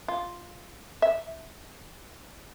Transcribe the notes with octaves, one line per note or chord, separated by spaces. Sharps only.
F4
E5